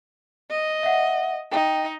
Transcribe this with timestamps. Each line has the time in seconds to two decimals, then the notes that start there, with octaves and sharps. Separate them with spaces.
0.50 D#5
0.83 E5 F#5
1.52 D#4 G5